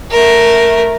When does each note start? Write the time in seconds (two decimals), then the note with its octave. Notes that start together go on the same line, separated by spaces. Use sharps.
0.11 A3 A#4